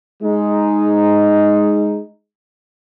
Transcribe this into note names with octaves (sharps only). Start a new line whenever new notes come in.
G#3 D#4